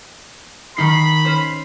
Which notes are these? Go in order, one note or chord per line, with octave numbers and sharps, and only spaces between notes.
D#3 D#4 B5 C7
C#4 C5